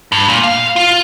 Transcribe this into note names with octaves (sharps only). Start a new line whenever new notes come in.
G2
A#2
F5
F4